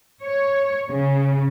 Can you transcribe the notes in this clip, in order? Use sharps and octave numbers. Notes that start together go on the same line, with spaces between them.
C#5
C#3